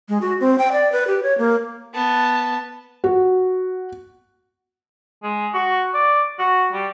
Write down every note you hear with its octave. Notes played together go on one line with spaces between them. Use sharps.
G#3
F#4
C4
G5
D5
B4
G4
C#5
A#3
B3 A5
F#4
G#3
F#4
D5
F#4
G3